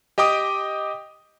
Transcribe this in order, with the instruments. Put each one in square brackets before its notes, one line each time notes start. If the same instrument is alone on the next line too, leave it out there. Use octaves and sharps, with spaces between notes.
[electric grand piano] G4 D#5 G5 D6 D#6